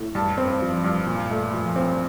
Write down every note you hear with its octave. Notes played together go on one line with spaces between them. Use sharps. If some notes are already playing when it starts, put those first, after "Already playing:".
Already playing: A2
G2 A5
C4
F3
G2
A#2
A3
F3
C4